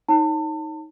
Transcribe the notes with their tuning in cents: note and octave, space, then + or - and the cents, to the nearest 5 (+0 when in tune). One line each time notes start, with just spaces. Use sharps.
D#4 +15 C#5 -10 A5 +30